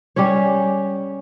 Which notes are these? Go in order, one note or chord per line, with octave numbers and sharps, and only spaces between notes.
G3 C#4 G4 C#5